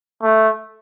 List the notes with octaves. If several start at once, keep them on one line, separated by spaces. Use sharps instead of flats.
A3